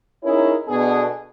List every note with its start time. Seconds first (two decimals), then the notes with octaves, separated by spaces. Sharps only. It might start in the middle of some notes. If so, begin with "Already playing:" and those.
0.23 C#4 D#4 E4 G#4 A#4 C#5
0.68 B2 B3 D4 G#4 A4 D5